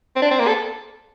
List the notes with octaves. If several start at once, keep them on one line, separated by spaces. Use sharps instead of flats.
C4
D4
C4
A#3
A4